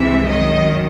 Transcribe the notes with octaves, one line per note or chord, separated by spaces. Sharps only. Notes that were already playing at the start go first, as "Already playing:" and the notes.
Already playing: C2 C3 E3 G#3 E5
F#2 D#3 D#5